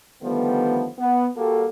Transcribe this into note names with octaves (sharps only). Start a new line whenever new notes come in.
D3 D#3 F3 G3 A3 B3
B3
G3 A#3 F#4 A4